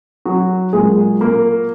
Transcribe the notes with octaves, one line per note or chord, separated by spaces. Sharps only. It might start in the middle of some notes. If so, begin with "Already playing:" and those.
F#3 F#4
A#2 F#3 G#3 A#3 G#4
A#3 A#4